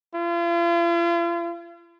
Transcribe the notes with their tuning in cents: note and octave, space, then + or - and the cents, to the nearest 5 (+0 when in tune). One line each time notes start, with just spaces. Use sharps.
F4 -40